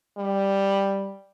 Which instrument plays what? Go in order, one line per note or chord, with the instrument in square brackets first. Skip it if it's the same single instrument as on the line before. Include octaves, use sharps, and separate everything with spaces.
[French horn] G3